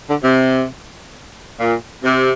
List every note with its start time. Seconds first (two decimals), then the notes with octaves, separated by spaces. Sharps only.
0.09 D3
0.23 C3
1.59 A#2
2.04 C3